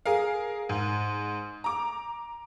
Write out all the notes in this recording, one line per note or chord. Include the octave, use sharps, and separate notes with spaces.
G#4 A#4 F5
G#2
A#5 D6